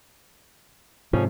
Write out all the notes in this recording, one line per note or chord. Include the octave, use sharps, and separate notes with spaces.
F2 G#2 C3 F3 C#4